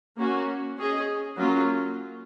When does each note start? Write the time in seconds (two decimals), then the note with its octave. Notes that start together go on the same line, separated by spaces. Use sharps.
0.17 A#3 C#4 F#4
0.77 C#4 G#4 D#5
1.37 F#3 A#3 C#4 F4